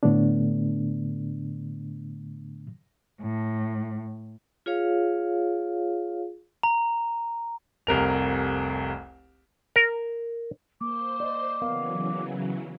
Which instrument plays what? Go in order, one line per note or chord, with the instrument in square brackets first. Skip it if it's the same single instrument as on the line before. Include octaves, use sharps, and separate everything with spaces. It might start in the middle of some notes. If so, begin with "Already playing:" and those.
[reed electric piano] A2 D3 A3 B3 D4
[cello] A2
[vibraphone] F4 G#4 C#5 F5
[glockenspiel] A#5
[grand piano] F1 C2 A#4 F7
[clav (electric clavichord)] A#4
[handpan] A#3 [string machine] C5 C6 [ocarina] D6
[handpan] D5 D#5
[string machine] C#3 E3 F#3 [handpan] B3 A#4 F5